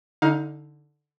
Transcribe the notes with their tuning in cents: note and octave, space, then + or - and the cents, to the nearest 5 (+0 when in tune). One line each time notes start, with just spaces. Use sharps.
D3 +0 D#4 +25 F5 +20